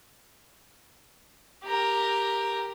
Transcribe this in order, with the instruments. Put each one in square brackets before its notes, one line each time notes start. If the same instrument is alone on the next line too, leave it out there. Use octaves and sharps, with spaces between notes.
[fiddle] G4 A#4